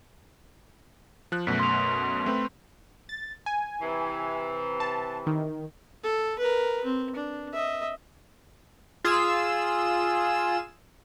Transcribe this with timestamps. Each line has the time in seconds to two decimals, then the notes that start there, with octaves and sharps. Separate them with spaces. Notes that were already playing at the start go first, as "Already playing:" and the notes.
1.32 F3 F#6
1.47 F#2 B2 A3 B6
1.59 C6 F7
2.26 A3 C4 B4
3.09 A6
3.46 G#5
3.82 C3 E3
4.80 A5
5.27 D#3
6.03 A4
6.39 A#4 B4
6.85 C4
7.15 D4
7.53 D#5 E5
9.05 F4 G#4 E6 E7